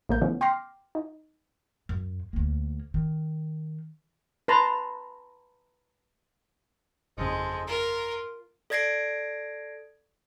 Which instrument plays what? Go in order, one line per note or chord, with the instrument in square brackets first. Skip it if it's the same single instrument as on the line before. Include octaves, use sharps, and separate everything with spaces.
[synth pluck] A#1 A3 A#3 A#4 G6
C#3 E3 F3 A3 B3 C#4
G5 C6 D6 F6 A#6 C7
D#4
[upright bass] F#2
D2 A#3
D#3
[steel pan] B4 A5 A#5 C6
[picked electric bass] G1 F2 C#3 [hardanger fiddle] G#3 [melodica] A4 C5 D#5
[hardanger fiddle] F4 [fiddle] A#4 [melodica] A#5
[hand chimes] A4 D5 G#6 A#6 C7 D7